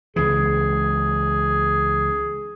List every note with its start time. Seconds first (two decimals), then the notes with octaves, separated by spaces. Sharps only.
0.16 C#2 E3 G#4